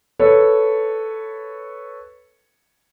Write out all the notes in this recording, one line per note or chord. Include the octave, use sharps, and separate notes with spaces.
A4 B4 C#5